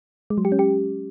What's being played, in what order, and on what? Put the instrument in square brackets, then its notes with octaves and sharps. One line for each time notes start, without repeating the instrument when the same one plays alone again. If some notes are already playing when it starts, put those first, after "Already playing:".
[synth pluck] G#3
F#3
G4
C#4
G4